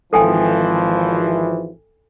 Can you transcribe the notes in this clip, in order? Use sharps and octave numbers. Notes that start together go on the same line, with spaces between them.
G#1 E3 F3 A4 G5 G#5